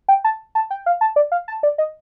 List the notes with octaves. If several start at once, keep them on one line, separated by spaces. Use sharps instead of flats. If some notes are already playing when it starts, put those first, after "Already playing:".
G5
A5
A5
G5
F5
A5
D5
F5
A5
D5
D#5